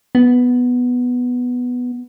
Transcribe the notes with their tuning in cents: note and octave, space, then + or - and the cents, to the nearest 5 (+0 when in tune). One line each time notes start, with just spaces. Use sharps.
B3 +0